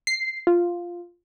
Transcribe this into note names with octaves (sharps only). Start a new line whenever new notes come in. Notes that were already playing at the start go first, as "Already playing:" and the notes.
C7
F4